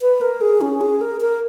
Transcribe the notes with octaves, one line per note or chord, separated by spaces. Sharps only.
B4
A#4
G#4
C#4
G#4
A#4
A#4